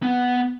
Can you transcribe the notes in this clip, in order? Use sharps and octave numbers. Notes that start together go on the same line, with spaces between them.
B3